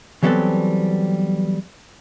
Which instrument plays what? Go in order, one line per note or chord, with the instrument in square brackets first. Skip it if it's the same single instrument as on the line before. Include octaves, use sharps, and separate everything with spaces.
[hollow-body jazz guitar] E3 F#3 G3 B3 C4 A4